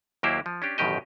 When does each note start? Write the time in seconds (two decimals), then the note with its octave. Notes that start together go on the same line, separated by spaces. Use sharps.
0.23 D#2 F#3 A#3 E4 G4 C5
0.46 F3
0.62 C#4 D4 G4
0.78 A1 F#2 B2 D#3 G4 D#5